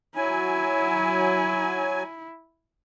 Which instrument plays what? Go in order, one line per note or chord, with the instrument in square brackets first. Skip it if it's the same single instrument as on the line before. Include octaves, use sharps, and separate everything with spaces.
[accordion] F#3 G#5 [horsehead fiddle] E4